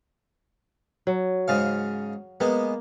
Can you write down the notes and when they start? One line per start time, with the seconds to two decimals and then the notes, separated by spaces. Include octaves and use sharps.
1.07 F#3
1.48 G#2 C#3 F5
2.40 G#3 A#3 B3